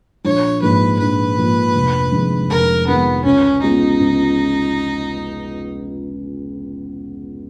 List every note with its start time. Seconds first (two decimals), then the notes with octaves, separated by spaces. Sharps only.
0.24 A#1 C#5
0.62 G#2 F3 A#3 B4
0.99 A#1 B4
1.38 G#2 F3 A#3
1.75 F1
2.12 F2 D#3 G#3
2.49 F1 A#4
2.87 F2 D#3 G#3 B3
3.24 C#2 C#4
3.62 C#3 G#3 B3 D#4 F4
3.99 C#2